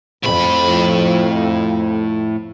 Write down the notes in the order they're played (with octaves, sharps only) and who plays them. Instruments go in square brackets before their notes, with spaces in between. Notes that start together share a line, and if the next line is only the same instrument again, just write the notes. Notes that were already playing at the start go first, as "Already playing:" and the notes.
[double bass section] F2 [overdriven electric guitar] A2 B5